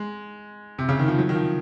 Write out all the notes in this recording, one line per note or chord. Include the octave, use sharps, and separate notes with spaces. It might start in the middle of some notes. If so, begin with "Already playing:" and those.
Already playing: G#3
C3
C#3
D#3
F3
F#3
D#3
F3